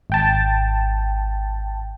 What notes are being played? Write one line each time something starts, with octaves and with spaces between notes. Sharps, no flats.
G#1 G5 A5